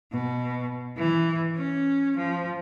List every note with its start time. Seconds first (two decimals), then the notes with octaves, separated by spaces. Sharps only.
0.13 B2
0.98 E3
1.56 C#4
2.17 F3